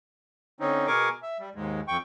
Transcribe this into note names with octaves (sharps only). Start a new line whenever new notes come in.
D3 C4 C#4 D#4
B2 G#4 A#4 C#6 D6
E5
G3
D#2 G#2 G#3
F2 G5 C#6